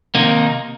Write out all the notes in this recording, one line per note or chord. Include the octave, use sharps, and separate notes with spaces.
C3 D#3 A#3 D#4